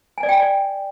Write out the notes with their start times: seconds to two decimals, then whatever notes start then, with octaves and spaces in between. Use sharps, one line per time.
0.18 G#5
0.23 D5
0.29 G5
0.34 G#5
0.40 D5